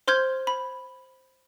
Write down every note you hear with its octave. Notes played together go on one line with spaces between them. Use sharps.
C5 C6 F6 G6 G#6
B5